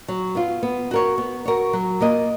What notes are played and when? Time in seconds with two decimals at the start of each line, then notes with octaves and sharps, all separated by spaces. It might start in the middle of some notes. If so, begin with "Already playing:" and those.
0.08 F#3
0.35 B3 F4
0.63 B3
0.91 F#4 A#4 C#5
1.18 B3
1.45 F#4 A#4 C#5
1.73 F#3
2.01 A#3 F4 A#4 D#5